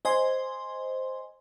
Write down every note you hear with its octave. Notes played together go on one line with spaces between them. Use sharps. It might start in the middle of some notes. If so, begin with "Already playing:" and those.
C5 D#5 G#5 C6